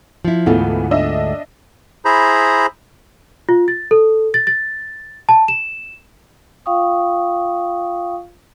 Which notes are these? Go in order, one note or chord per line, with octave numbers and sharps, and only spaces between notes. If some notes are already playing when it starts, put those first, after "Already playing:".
F3 E4
D2 G#2 E3 A3 B3 F4
D4 D#5 E5
E4 G#4 C5 A#5 B5
F4
A6
A4
A6
A6
A5
E7
F4 F5 G5 C#6 D#6